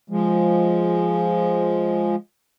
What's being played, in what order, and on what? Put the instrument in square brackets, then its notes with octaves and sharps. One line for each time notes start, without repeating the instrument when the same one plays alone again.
[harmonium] F3 G#3